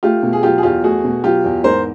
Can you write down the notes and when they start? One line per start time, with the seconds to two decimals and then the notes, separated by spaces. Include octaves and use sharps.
0.03 A3 F4 G4
0.23 B2
0.33 G#4
0.43 F#3 F4 G4
0.58 G#4
0.63 E2 F4 G4
0.84 A3 F#4 G#4
1.04 B2
1.24 F#3 F4 G4
1.45 E2
1.64 G#2 A#4 C5